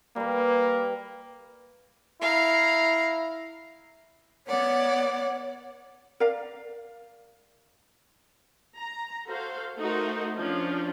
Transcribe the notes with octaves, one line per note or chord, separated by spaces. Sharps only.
G3 A#3 B4
E4 F5 A#5
B3 C#5 D5 F#5
A#4 D5 F5
A#5
F#4 A4 C5 F5
A3 D#4 F#4 A#4 C5
F3 C#4 D4 F4